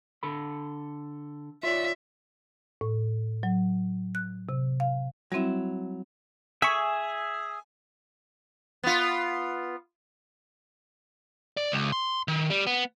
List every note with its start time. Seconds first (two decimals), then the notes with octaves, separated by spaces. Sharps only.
0.23 D3 A4 B5
1.63 F4 C#5 D5 E5
2.81 A2
3.43 F#3
4.15 F#6
4.49 C3
4.80 F5
5.32 F#3 G3 C4 E4
6.62 G#4 E5 G#5 C#6 B6
8.84 B3 F4
11.57 D5
11.72 C#2
11.92 C6
12.28 D#3
12.50 G3
12.67 B3